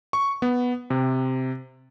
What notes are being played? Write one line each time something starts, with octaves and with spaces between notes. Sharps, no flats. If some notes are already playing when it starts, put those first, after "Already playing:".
C#6
B3
C3